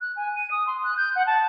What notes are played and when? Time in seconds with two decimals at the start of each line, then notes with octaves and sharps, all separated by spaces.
0.01 F#6
0.16 G#5
0.36 D#7
0.51 D#6
0.67 C6
0.84 F#6
0.97 G6
1.16 F#5
1.27 A5